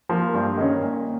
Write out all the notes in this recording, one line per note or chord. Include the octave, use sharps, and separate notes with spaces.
F3 A#3
G2
D#3 A#3 C#4
A#2